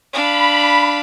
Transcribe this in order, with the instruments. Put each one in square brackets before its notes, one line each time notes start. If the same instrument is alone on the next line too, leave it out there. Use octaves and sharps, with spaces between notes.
[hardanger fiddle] D4 F5 [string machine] B5